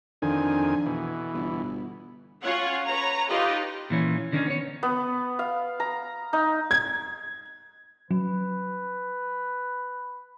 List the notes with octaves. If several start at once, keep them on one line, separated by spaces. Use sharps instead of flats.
F2 D3 D#3 G#5
B2 E3
G1
C#4 F4 C#5 F#5
B4 C#5 A#5
D#4 F4 G4 B4 D#5
A#2 E3 C#4
D3 D#3 A#3 C4 C#4 D#4
B3 C#5
B3
F5
A#5
D#4
G#6
F#3 C#4 B4